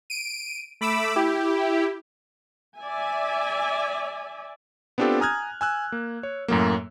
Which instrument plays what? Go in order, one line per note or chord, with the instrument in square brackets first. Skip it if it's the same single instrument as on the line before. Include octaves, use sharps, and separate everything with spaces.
[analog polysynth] D7 D#7
A3 B5 D6 E6
E4 G4
[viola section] D5 E5 G#5
[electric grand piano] B3 C4 D4 F4 G4 A4
G#5 A#5 D#6 F6 F#6 G#6
G#5 E6 F#6
A#3
C#5
F#2 A2 F#3 A#3